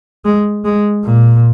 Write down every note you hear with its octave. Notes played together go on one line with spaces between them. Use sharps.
G#3
G#3
A#2